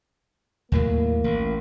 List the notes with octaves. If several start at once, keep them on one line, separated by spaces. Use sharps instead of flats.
D#2 A2 F#3 A#3
A1